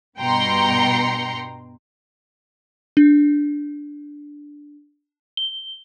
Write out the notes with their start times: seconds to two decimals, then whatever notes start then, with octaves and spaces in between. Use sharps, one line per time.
0.19 G2 B2 G5 A#5 C6 C#7
2.97 D4
5.37 G7